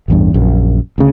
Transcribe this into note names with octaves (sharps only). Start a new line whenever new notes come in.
A1 E2 G2
A#1 F#2
D2 C#3